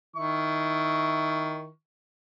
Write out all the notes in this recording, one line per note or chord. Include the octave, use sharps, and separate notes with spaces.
D#3 E4 C#6